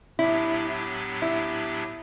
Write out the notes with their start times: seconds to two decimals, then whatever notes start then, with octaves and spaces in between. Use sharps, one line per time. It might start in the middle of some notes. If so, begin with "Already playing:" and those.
0.19 A2 F#3 B3 D4 E4 G4
1.22 E4